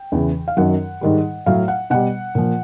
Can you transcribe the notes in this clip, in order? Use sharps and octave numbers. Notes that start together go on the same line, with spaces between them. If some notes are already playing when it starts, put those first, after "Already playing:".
Already playing: G5
E2 C#3 E3
F5
F#2 D#3 F#3 F#5
G#2 D#3 G3
A2 F#3 F5
F#5
B2 G3 F#5
A#2 F3